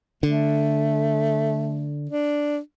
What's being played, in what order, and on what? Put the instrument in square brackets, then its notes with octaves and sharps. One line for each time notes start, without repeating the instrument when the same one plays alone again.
[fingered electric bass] D3 [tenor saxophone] A3
[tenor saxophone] D4